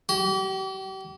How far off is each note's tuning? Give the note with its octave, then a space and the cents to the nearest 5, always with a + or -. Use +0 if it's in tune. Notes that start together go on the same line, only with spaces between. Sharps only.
G4 -40